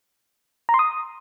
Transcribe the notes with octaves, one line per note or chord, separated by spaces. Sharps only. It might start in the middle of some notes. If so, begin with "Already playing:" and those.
A#5
C6
D#6